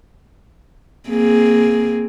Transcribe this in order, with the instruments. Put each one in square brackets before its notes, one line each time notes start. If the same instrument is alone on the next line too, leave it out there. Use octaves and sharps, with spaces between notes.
[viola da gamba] A#3 C4 G#4